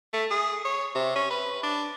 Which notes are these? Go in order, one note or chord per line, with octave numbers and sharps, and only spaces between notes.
A3
G#4
C#5
C3
C#4
B4
D4